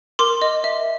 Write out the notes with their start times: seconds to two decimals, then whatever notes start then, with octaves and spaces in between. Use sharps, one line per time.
0.19 A#4 C6 D6
0.42 D#5
0.64 E5